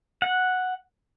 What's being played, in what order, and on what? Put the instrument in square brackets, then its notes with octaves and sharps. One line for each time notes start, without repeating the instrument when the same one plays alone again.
[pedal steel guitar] F#5